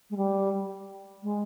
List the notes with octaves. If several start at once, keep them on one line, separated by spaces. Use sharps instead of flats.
G#3
G3
G#3